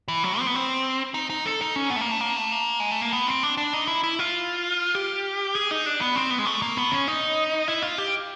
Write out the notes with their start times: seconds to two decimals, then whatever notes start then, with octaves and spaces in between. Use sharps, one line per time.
0.08 E3
0.24 F#3
0.39 C4
0.47 B3
0.55 C4
1.14 D#4
1.30 D#4
1.46 A4
1.61 D#4
1.76 C#4
1.90 B3
1.96 A3
2.01 A#3
2.11 A3
2.20 A#3
2.37 A3
2.52 A#3
2.80 G#3
2.91 A3
3.01 A#3
3.13 B3
3.27 C4
3.43 D4
3.57 D4
3.73 D#4
3.88 E4
4.04 E4
4.19 F4
4.95 G4
5.55 G#4
5.71 D#4
5.86 D4
6.01 B3
6.16 C4
6.30 B3
6.39 G#3
6.46 A3
6.62 A#3
6.77 B3
6.91 C#4
7.08 D#4
7.68 E4
7.82 F4
7.98 G4